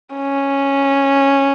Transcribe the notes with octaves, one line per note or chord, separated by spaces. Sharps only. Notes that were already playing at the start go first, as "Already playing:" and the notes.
C#4